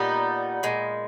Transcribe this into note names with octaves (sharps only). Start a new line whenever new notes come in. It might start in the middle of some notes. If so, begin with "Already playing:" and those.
Already playing: A#2 G3 B3 D#4
A#2 G#3